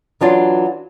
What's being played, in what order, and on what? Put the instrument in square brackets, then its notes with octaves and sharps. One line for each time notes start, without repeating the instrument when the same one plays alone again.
[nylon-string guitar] E3 F#3 D4 F4